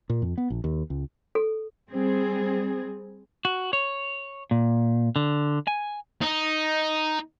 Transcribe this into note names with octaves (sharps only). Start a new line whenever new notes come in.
A#2
F2
B3
A#1
D#2
C#2
A4
G3 C4 G#4
F#4
C#5
A#2
D3
G#5
D#4